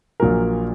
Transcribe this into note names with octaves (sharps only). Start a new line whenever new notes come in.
A#1 A#2 F#3 A#4